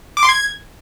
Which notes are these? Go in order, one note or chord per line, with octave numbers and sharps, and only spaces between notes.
D6
C6
G#6